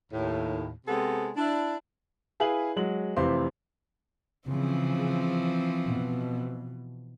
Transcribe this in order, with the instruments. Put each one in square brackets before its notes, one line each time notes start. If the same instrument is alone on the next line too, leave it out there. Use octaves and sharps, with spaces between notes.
[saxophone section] D#2 A2
C3 G#3 B3 C4 A4
D4 E4
[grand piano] E4 G#4 B4 F5 G#5 F#7
F#3 G#3 F#7
F1 C3 E3 C4 F5 C6
[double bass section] C#3 [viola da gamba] E3 F3 C4
[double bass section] B2